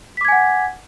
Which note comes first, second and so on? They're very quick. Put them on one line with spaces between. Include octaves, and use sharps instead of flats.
B6 D6 G#6 G#5 F#5